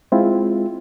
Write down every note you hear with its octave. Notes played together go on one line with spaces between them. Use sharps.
G#3 C4 E4 F4